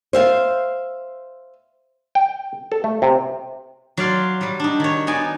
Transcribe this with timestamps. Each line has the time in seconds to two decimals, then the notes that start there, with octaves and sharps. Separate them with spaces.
0.13 C5 E5 F5
2.15 G5
2.72 A4
2.84 A3
3.02 C3
3.97 F#3 D5 F5 C6
4.41 F#3 G3
4.60 D4 D#4
4.80 D#3 C#5
5.07 B3 D#4 D5 G#5